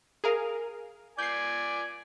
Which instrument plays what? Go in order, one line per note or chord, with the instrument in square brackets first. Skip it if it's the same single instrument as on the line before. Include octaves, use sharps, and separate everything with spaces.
[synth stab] G#4 A#4 F5
[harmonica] D5 G#5 [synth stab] G6 C7